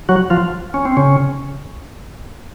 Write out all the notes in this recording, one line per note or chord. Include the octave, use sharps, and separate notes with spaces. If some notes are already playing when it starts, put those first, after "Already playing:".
F#3 F#4
F3 F4
C#4
C4
C#3 C#4